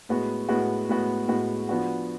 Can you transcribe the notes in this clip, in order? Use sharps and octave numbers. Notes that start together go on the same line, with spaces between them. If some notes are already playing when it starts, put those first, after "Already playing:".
A2 G#3 B3 F#4
A2 G#3 B3 F#4
A2 G#3 B3 F#4
A2 G#3 B3 F#4
F3 B3 D4 F#4